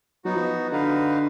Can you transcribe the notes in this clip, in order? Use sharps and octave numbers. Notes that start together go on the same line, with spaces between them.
F#3 B3 D#4 F#4
F3
D3 D#4 F#4 B4 F5